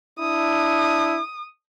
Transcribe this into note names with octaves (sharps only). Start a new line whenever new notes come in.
D4 E4 D#6